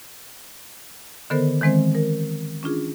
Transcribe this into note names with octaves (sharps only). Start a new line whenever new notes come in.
D3 D#3 B3 A4 A#4 C5
D#3 E3 G#3 C4 C5
A#4
C#4 D4 F4 G#4